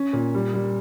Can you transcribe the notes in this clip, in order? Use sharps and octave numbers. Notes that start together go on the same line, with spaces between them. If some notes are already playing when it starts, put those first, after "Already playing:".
Already playing: C#4
A#2
G3
G3